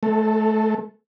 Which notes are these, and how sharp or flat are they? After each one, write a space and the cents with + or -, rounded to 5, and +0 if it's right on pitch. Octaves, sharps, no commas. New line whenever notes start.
A3 -25 A4 +15